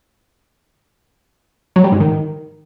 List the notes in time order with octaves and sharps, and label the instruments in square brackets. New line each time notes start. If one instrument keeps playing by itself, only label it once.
[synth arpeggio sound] F#3
G3
G#2
D#3